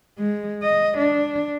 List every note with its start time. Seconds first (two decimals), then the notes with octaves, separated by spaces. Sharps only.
0.19 G#3
0.63 D#5
0.98 D4